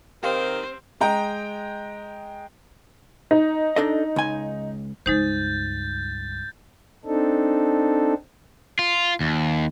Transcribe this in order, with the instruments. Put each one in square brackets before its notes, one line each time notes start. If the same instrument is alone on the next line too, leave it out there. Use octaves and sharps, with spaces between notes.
[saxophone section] D#3 A#4 [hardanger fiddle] C4 [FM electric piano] G4 F5 [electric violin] C5
[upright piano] G#3 D#5 G5 A#5
[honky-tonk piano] D#4
[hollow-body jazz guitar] D4 A4 D#5
C#2 G#5
[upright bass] C#2 G2 [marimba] G#3 D#4 C5 [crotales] G6 A6
[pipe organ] C4 D4 D#4 A4
[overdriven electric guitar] F4
D#2